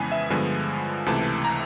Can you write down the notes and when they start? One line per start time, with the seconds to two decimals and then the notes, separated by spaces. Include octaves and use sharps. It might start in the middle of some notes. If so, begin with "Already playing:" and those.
Already playing: F2 C#3 E3 G#3 B3 G#5
0.12 E5
0.30 G2 D3 F3 G#3 B3 G#5
1.06 C#2 C3 E3 A3 A5
1.45 A#5